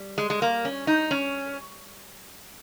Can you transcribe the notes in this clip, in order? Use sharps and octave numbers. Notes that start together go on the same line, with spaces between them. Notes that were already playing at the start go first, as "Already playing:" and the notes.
Already playing: G3
G#3
G#3
A#3
C#4
D#4
C#4